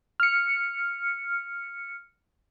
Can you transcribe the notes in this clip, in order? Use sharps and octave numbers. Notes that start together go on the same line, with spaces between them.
F6 C#7